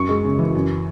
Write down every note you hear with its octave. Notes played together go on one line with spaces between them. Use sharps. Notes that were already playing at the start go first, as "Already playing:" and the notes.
Already playing: F#2 C#6
G#3
C#3
E3
F#2